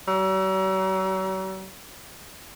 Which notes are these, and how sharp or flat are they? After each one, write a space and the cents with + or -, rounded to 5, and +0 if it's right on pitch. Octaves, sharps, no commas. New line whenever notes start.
F#3 +45